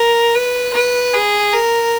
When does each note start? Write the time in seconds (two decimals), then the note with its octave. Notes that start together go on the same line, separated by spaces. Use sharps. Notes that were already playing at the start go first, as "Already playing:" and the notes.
Already playing: A#4
0.35 B4
0.74 B4
1.14 G#4
1.53 A#4